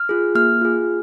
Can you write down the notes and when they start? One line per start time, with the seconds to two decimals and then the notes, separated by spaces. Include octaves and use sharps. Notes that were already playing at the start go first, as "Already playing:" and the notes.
Already playing: F6
0.09 F4 G#4
0.35 A#3 F6
0.61 F4 G#4